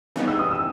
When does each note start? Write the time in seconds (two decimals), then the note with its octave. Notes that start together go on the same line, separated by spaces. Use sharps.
0.16 C#3 E3 G3 B3 D#4
0.27 E6
0.39 D#6
0.51 E6